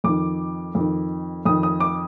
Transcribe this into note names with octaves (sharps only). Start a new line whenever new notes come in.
F2 D#3 D6
F2 D#3
F2 D#3 D#6
D#6
D6